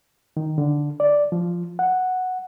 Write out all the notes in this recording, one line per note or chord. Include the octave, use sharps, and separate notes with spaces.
D#3
D3
D5
F3
F#5